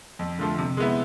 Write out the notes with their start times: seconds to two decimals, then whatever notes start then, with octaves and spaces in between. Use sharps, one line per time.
0.19 F2
0.39 D3 F3 A3
0.58 C3
0.77 G#3 B3 E4